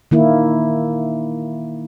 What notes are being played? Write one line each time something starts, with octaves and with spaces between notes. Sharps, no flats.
D#3 A#3 E4